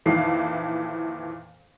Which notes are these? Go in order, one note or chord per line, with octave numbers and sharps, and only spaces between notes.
F2 A#2 D#3 E3 C7